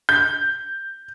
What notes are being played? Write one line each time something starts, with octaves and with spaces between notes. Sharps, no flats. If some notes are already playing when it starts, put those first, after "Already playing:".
G6